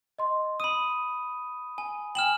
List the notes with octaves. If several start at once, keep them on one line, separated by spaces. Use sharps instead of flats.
D#5 C6
B5 D#6 D#7
G#5
G5 G#5 F6 E7 F#7